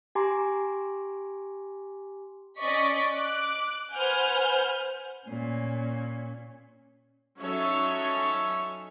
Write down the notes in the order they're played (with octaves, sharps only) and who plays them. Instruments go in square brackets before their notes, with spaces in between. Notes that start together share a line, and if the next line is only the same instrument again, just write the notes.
[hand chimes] G4 G#5 A#5 C6 D6
[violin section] C#4 D5 D#5 C#6 B6
D6 F#6
B4 C5 F#5 G#5 F6 G6
[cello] A#2 C#4
[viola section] F#3 C#4 D#4 A4 C#5 E5